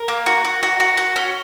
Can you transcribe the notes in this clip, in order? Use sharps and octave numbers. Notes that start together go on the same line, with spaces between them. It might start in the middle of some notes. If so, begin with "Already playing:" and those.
Already playing: A#4
A#3
F#4
F#4
F#4
F#4
F#4
C#4